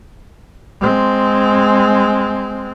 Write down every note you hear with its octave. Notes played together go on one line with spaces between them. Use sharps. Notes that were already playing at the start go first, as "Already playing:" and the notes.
G#3 C4